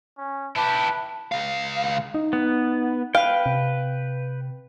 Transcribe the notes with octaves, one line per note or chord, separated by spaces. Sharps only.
C#4
E4 G4 B4 A5
C#2 F5
D#4
B3
B4 F5 G5
C3